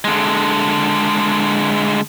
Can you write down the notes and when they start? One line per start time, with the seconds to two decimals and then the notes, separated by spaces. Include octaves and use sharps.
0.04 D3 G#3